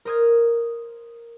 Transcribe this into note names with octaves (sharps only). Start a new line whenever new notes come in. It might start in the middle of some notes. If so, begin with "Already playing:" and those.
A#4 C5 D#6 F6 G#6